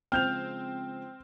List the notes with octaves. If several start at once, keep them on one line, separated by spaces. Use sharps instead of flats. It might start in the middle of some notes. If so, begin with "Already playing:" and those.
C#3 F3 G#3 C4 G5 F6 G6 F7